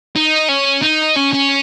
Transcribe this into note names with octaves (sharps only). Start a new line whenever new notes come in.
D#4
C#4
D#4
C#4
C#4